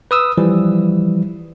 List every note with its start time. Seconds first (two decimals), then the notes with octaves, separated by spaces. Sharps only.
0.11 B4 D#6 E6
0.38 E3 F3 G3